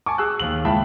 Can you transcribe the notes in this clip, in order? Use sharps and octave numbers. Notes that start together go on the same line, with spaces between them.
G#5 A5 C#6 D6
G#4 E6 F#6
D#2 F#7
C#2 E4 E5 G5 A5 B5